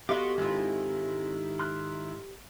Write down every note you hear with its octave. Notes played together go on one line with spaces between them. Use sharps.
B3 F#4 G4 A4 D#5 F5 C6 D6
G#2 D#3 G#3 C4 E4 F4
C6 F6 F#6